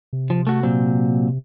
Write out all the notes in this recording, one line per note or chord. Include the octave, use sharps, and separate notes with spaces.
C3
F3
A3 F#4
A#2 F#3 C4